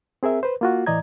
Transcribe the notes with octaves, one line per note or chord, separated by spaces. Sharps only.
C4 G#4 A#4 E5
B4 C5
A#3 F4 F#4
A2 E3 D5 D#5 A#5 G#6